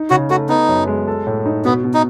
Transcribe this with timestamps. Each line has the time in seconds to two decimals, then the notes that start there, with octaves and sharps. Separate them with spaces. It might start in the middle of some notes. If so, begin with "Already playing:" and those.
Already playing: D#4
0.10 C#3 F#4
0.30 A3 F#4
0.49 B3 D#4
0.69 F#2
0.87 G#3
1.08 A4
1.27 A2
1.46 D#4
1.65 B2 B3
1.84 B2
1.94 D#4